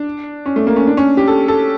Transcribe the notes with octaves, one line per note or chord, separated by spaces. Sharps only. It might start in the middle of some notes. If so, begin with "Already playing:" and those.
Already playing: D4
C#4
A3
A#3
C#4
D4
C#4
G4
A4
A4